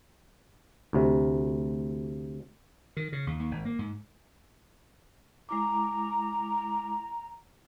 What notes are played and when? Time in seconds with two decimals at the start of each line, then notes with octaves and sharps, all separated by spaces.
0.93 D2 C3
2.97 D#3
3.12 C#3
3.27 D#2
3.40 D#2
3.51 G#1
3.65 A#3
3.79 G#2
5.49 G#3 E4 A#5 D6